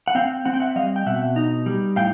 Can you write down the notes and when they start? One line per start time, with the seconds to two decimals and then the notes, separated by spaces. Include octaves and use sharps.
0.08 F#5
0.15 C4 F5 G5
0.45 C4 F#5
0.54 G5
0.60 E5 F#5
0.76 G3 D#5 F5
0.96 G5
1.06 B2 E5 F#5
1.36 D#4
1.66 G3
1.96 A2 F5 G5